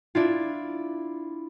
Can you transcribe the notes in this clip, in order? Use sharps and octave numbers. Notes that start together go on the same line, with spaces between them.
D4 E4 F4